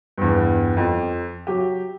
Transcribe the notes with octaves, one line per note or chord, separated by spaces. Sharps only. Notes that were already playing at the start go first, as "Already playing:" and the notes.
E2 G2
F2
F#3 G4